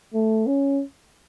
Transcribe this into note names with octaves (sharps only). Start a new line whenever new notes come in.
A3
C#4